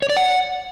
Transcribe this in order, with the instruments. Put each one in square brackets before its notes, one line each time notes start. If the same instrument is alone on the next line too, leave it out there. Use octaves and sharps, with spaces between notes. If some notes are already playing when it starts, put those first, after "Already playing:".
[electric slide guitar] C#5
D5
F#5